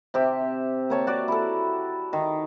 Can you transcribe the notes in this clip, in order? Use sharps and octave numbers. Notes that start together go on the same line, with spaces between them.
C3 G4 E5
A#3 C#5 A5
F#4 D5
E4 A4
D#3